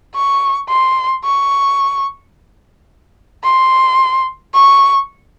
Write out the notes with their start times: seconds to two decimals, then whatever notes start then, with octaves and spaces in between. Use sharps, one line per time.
0.15 C#6
0.69 C6
1.24 C#6
3.43 C6
4.54 C#6